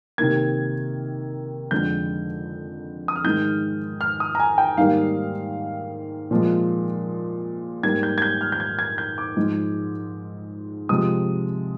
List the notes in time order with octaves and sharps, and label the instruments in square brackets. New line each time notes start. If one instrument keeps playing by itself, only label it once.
[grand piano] C3 D#3 A#3 G#6
F2 D3 G#3 G6
D#6
F6
G#2 D#3 G#3 G6
F6
D#6
A#5
G#5
G5
G#2 D#3 G3 A#3 F5
A#2 F3 G#3
G#2 G3 A#3 G#6
G6
G#6
G6
F6
G6
G#6
G#6
G6
D6
G#2 F3 G#3
C3 F3 G#3 D#6